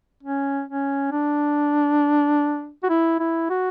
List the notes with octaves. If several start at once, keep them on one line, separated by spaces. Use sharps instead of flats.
C#4
C#4
D4
F#4
E4
E4
F#4